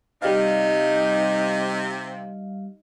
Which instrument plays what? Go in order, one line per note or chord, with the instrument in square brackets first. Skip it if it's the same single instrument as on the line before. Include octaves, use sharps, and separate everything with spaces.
[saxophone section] C3 [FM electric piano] G3 F5 [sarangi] D#4